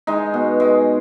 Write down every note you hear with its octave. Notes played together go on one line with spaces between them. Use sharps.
G#3 D#4
B2
G#3